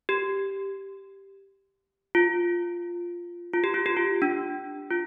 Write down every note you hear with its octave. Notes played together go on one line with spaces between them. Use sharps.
G4
F4
F4
G4
F4
G4
F4
D4
F4